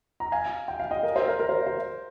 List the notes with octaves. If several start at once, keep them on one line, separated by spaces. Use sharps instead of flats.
A#5
F5 G#5
G5
F5
D#5 G5
A#4
C5
A#4
A#4
C5
C5